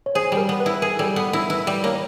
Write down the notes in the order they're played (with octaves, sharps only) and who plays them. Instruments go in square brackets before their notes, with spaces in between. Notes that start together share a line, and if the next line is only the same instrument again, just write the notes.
[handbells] C#5
[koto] G#4 [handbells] C5
[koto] G3
[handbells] A#4
[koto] B3
[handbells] B4
[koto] E4
[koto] G#4 [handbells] A#4
[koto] G3 [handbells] A4
[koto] B3 [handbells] A4
[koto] E4 [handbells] A#4
[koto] E4 [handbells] B4
[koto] G3
[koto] A#3 [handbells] C#5